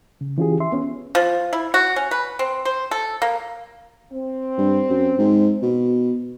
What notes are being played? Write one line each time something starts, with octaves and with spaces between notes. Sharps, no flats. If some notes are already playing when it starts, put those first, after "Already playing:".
C#3
E3 C#4 F4 G4 G#4
E5 C6
B3 C#4
F3
E4
F#4
C#4
B4
C4
C5
A4
A#3
C4
G2
F#2
G#2
B2